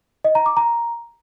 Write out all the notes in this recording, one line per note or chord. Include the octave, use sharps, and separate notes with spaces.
D#5
A#5
D6
A#5